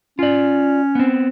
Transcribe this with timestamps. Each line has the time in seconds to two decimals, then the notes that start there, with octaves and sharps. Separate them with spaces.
0.19 C#4 F4 D5
0.95 B3 C4